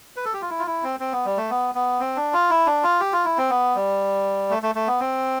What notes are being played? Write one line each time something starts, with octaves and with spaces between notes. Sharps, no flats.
B4
A4
G4
F4
E4
F4
E4
C4
C4
B3
G3
A3
B3
B3
C4
D4
F4
E4
D4
F4
G4
F4
E4
C4
B3
G3
A3
A3
A3
B3
C4